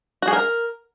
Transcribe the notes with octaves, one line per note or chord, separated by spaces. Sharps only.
F#4
G#4
A#4